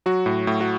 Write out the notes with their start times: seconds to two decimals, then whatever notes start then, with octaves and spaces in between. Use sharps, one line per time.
0.06 F#3 F#4
0.26 A2
0.47 A2
0.61 F#4